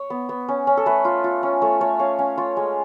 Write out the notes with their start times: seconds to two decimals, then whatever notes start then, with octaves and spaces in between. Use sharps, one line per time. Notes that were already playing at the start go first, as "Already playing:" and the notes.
Already playing: C#5
0.10 B3
0.29 B3
0.49 C#4
0.67 C#4
0.77 A4
0.86 A3 B4
1.05 F4
1.24 F4
1.43 C#4
1.62 A3 C#5
1.80 A3 C#5
1.99 C#4 F5
2.19 C#4 F5
2.38 F4 C#5
2.57 G#3